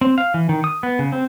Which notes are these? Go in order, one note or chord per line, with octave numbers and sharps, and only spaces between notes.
C4
F5
E3
D#3
D#6
B3
C#3
C4